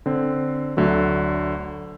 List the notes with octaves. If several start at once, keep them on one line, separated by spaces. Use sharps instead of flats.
D3 C4
D2 D3 F#3 A3